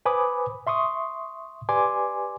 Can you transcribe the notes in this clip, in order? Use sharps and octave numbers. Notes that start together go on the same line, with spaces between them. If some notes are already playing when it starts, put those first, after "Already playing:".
B4 C5 G#5 B5 D6 D#6
E5 C6 C#6 D#6
G4 B4 D5 G#5 C6 D6